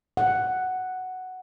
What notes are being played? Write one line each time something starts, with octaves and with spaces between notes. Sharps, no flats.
F#5